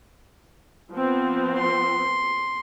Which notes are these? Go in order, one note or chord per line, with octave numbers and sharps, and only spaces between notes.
F3 B3 C4
C6